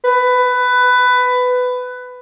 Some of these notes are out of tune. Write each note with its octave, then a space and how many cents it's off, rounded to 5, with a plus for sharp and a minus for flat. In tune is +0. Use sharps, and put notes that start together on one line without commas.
B4 +15